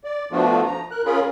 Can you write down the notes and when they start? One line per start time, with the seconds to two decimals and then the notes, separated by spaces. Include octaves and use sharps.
0.04 D5
0.32 F3 A3 B3 D4 F4 F#4
0.66 F3 A#5
0.91 A#4 F#6
1.05 C#4 F4 G#4 A#4 B5